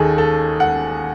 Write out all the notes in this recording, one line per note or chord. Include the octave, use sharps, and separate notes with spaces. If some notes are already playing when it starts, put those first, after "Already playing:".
Already playing: D#2 D#3 G#4 A4
A4
F#5